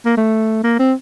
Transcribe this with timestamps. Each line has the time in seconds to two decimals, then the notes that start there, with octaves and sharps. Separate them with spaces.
0.05 A#3
0.17 A3
0.63 A#3
0.79 C4